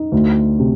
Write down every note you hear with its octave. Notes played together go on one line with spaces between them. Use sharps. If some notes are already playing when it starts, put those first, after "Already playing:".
Already playing: D#4
D2
C3